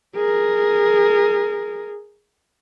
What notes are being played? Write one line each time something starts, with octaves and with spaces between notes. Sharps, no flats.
G#4 A#4